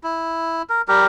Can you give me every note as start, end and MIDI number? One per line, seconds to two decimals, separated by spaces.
0.04 0.62 64
0.69 0.82 70
0.88 1.07 55
0.88 1.07 67
0.88 1.07 70